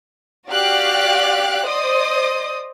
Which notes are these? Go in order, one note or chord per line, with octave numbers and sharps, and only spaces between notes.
F#4 G4 D5 F5 F#6
C5 D5 D#5 D#6